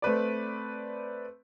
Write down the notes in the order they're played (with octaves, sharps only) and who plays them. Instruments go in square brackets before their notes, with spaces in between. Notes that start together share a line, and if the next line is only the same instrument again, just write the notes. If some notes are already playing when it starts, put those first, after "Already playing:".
[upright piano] A3 C4 B4 D5